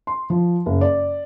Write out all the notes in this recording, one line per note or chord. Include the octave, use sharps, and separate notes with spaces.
C6
F3
F#1
D5